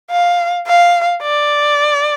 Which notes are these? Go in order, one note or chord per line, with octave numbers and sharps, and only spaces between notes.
F5
F5
D5